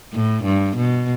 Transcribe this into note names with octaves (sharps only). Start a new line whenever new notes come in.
A2
G2
B2